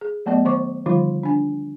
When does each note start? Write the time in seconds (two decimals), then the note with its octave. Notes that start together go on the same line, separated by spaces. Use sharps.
0.01 G#4
0.26 F#3 A3 B3 D5 D#5
0.45 D#3 C5 C#6 D6
0.86 D3 D#3 F3 G3 D#4 F4
1.23 D4 G#5